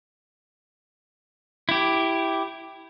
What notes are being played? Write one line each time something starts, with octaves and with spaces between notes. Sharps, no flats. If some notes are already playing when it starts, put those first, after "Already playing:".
E4 G4